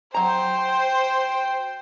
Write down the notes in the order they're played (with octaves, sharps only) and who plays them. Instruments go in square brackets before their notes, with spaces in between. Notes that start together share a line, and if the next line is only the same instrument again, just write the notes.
[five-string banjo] F#3 A#5 [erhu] C5 [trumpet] G5